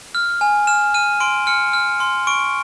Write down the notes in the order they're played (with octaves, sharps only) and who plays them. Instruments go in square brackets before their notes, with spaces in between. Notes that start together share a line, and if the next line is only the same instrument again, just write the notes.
[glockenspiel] F6
G#5
F6 E7
F6 D#7
C6 D7
F6 C#7
F6
C6
C#6 D7